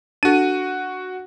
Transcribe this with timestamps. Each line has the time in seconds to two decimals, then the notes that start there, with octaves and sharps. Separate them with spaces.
0.23 D4 F#4 A4 D#7